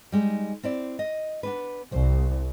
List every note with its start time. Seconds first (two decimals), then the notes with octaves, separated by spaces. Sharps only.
0.12 G3 G#3 D#4
0.63 C4 E4 D5
0.99 D#5
1.43 B3 D4 B4
1.92 C2 C5